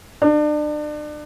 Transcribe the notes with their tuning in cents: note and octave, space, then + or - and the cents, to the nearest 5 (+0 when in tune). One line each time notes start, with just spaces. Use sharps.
D4 +35